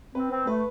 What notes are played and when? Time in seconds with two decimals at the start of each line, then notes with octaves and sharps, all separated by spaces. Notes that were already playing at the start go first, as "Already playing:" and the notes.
0.15 C4 B4
0.31 C4
0.47 A3 B4